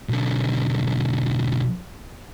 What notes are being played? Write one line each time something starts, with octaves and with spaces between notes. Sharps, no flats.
B1 D3